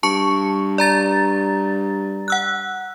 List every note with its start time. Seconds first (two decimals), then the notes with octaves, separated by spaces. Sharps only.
0.03 G2 A5 C#6 C#7
0.78 D5 A#5 A6
2.28 F#5 E6 F#6